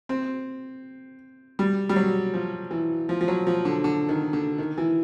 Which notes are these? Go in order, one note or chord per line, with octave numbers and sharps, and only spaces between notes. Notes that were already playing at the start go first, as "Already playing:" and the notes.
C4
G3
G3
F#3
F3
E3
F3
F3
F#3
F3
D3
D3
D#3
D3
D#3
E3